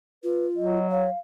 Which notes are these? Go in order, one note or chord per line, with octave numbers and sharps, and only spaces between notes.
F4 B4
F#3 D#5
C#5 F5